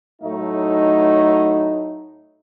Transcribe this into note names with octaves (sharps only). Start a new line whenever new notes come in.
A2 F#3 A3 D#4